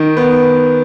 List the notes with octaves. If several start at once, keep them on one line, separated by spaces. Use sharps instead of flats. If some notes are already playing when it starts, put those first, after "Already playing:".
Already playing: D#3
B3